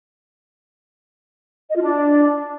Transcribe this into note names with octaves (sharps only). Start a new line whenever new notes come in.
D#5
F4
D4